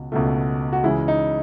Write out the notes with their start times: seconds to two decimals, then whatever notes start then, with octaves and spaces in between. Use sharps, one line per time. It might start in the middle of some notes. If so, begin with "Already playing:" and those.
Already playing: C#2 B2
0.12 C#2 B2 A3
0.73 F#4
0.83 C#2 C#3 E3 G#3 E4
1.08 D#4